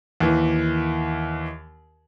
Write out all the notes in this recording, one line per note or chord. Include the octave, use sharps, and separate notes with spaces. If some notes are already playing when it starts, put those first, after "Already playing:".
D#2 E3